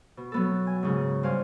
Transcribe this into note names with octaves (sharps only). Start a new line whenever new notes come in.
B2
F#3 B3 A4
G#5
G#2 C#3
G2 C5 F5 F#5 G#5